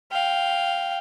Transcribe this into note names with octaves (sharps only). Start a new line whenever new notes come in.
F5 G5